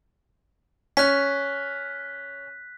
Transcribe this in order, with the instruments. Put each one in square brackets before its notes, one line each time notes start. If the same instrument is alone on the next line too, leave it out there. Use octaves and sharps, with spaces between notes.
[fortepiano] C#4 [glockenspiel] F#6 B6